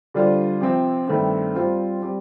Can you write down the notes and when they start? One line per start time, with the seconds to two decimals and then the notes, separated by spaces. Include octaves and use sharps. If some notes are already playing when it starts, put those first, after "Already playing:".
0.14 D3 G3 D4 F4 C5
0.61 C3 F3 C4
1.08 G2 D#3 A3 C4
1.55 G3 C4 F4 C5
2.02 G3 C4 G4